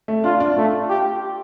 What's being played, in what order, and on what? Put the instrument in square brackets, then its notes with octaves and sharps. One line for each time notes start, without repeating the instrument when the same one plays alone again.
[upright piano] A3
[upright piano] D4 [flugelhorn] F4
[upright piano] D4
[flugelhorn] A3 [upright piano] F4
[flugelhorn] G4